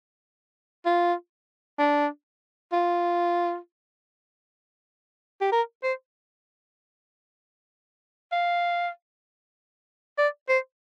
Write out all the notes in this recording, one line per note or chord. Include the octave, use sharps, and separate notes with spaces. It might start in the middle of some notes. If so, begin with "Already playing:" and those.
F4
D4
F4
G4
A#4
C5
F5
D5
C5